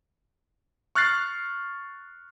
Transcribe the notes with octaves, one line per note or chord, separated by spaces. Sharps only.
C#6 F6 F#6 A6 C7